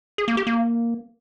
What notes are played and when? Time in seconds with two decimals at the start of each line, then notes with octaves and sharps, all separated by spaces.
0.18 G#4
0.28 A#3
0.37 G4
0.47 A#3